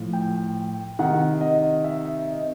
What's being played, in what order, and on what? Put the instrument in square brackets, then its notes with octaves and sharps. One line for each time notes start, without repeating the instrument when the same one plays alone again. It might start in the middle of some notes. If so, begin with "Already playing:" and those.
Already playing: [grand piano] A2 F3
G5
C3 D#3 F#5
D#5
E5
D#5